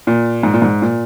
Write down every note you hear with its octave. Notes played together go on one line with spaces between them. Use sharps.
A#2
G#2
A#2
G#2
A#2